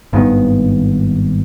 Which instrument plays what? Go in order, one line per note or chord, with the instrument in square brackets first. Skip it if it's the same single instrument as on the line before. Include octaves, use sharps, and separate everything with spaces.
[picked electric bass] G#1 G2 D#3 B3